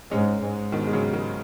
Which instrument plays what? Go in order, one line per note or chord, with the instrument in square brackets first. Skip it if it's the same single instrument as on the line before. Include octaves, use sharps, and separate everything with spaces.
[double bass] G#2 [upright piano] G#3 C#4
[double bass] G#2
[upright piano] B2 D#3
G#3
C#3 F#3
D#3 G#3